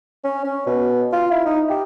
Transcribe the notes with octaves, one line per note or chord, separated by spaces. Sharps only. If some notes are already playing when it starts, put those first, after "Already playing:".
C#4
C#4
B2
F4
E4
D#4
G4